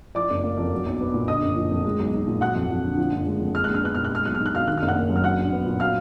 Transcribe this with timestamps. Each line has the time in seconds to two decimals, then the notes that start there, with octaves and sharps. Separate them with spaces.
0.15 F3 D5 D6
0.30 F#1
0.44 A#3
0.57 F2
0.72 F#3
0.86 B1
1.01 B3
1.14 A#2
1.28 D3 D#5 D#6
1.42 F#1
1.56 F3
1.71 F2
1.85 G#3
1.99 B1
2.13 D#4
2.27 A#2
2.41 F#3 F#5 F#6
2.55 F2
2.70 F2
2.84 D3
2.97 F3
3.12 F#1
3.26 G#3
3.40 F2
3.54 G#3 F6
3.64 A#1 F#6
3.74 F6
3.83 B3 F#6
3.95 A#2 F6
4.04 F#6
4.11 G#3 F6
4.25 B1 F#6
4.34 F6
4.40 D#4
4.46 F#6
4.53 B2 F5 F6
4.67 D#3 F#6
4.78 F#1 F6
4.88 F#5 F#6
4.96 A#3
5.10 F#2
5.16 F6
5.24 F#3 F#5 F#6
5.38 A#1
5.52 B3
5.66 A#2
5.80 F#3 F5 F6